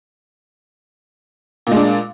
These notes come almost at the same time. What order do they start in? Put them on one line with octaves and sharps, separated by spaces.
A#2 G#3 D4